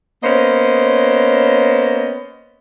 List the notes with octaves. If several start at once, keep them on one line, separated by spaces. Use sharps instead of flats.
A#3 B3 C#4 C5 D#5